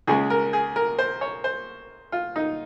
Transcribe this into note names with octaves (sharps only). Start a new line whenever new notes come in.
C#2 C#3 G#3 G#4
A#4
G#4
A#4
C5
C#5
C5
F4
D#4